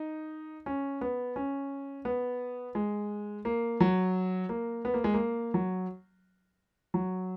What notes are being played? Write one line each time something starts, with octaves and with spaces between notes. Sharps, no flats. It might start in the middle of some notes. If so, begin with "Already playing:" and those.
Already playing: D#4
C#4
B3
C#4
B3
G#3
A#3
F#3
A#3
B3
A#3
G#3
A#3
F#3
F#3